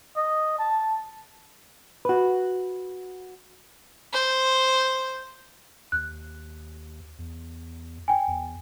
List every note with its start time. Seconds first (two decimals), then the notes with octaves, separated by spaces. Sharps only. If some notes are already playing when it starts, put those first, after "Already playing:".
0.17 D#5
0.59 A5
2.05 F#4 B4
4.13 C5
5.92 D#2 F#6
7.18 E2
8.08 G5 G#5
8.27 E2